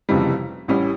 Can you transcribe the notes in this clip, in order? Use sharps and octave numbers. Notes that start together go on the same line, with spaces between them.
F1 F2 C#3 E3 G3
A1 A2 G3 C#4